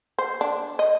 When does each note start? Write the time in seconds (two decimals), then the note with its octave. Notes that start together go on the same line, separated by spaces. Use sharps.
0.18 C5
0.41 D4
0.79 D#5